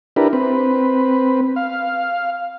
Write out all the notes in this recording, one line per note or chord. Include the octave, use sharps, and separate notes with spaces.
D4 E4 G4 A#4 B4
C4 B4
F5